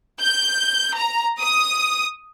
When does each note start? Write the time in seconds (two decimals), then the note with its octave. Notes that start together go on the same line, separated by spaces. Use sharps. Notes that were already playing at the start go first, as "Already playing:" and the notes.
0.20 G6
0.97 A#5
1.41 D#6